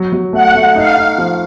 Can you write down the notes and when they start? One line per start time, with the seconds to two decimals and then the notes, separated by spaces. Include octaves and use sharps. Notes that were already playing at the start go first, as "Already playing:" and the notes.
Already playing: F#3
0.13 F#3
0.33 A3 F#5
0.55 A3
0.76 D#4 F5
0.97 D#4
1.18 F3